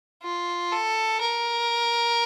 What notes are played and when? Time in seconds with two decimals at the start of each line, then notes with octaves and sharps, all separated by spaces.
0.23 F4
0.72 A4
1.21 A#4